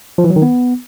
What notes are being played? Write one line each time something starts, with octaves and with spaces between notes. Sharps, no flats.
F3
E3
F#3
D#3
B3